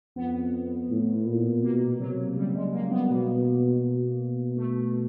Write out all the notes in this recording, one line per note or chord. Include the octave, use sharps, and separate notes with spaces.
F2 B3
A2
A#2
B2 A#3
C3 F#3
C#3 G3
G#3
A#3
B3
B2 A#3
B2
A3